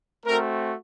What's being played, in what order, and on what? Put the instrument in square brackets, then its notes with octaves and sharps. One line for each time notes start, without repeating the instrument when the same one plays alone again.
[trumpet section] A3 C4 F#4 A#4